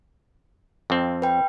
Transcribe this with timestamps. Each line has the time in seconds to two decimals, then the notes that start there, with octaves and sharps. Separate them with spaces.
0.90 F2 C4
1.22 B4 G5